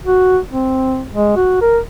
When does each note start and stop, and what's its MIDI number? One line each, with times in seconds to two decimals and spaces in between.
0.06 0.38 66
0.51 1.04 60
1.13 1.34 56
1.36 1.59 66
1.61 1.79 70